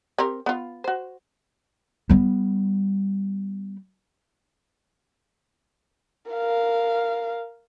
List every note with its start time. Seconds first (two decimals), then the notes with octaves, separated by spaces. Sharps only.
0.18 C4 G4 A#4
0.46 B3 F4
0.84 F#4 C5
2.09 G3 B3
6.32 A#4 F5